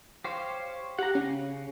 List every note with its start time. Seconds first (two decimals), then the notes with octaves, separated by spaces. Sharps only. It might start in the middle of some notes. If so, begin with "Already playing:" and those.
0.24 G4 C5 C#5 F5
0.99 G4 F#5 A#5
1.15 C#3 C#4